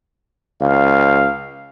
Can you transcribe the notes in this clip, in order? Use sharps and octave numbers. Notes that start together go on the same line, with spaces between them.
C#2 F5